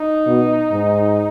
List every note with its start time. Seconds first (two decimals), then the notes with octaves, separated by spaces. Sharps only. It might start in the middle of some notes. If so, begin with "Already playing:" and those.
Already playing: D#4
0.27 B2
0.72 G#2